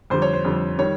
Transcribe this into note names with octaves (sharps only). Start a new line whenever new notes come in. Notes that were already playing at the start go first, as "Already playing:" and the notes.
F2 D3 G3 C5
C#5
C5
F2 D3 G3
D#3 G3 C#5